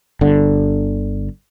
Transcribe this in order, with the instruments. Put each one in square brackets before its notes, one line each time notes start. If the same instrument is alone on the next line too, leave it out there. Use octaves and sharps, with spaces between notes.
[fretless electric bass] G1 D3